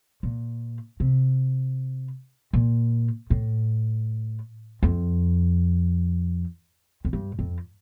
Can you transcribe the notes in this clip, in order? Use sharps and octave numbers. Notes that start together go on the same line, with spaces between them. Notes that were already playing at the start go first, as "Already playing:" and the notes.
A#2
C3
A#2
A2
F2
F2
G2
F2